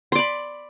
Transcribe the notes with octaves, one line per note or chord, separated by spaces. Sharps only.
D5 B5 C6